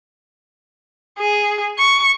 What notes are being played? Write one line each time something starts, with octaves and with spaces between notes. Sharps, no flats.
G#4
C#6